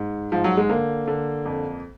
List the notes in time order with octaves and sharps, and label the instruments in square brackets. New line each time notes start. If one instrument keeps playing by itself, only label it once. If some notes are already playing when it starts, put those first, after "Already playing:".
Already playing: [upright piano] G#2
G#2 F3
F#3
G#3
D3 A#3
D3
F2